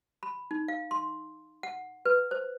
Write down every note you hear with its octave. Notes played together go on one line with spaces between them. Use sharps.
B5
D#4
F5
C6
F#5
B4
C5